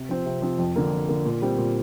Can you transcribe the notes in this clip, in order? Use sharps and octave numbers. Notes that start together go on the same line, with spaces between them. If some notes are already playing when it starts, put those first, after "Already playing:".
Already playing: C3
F3 C4
C3
F3 C4
F2
D3 A#3
F2
D3 A#3
A#2
G3 C4
A#2